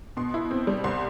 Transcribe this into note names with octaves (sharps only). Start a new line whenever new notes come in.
B2 C6
E4
C4
G3
C2 C6